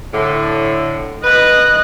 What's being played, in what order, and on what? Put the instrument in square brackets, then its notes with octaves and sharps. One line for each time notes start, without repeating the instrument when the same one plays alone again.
[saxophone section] A2 D3
[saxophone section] B4 [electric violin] D#5 F#6